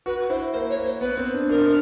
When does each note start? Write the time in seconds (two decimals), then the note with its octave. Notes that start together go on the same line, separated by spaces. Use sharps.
0.06 F#4 B4
0.29 E4 C5
0.53 A#3 C5
0.70 C#5
0.77 A#3
0.85 C5
1.01 B3 B4
1.17 C4
1.34 D4
1.50 D4 A#4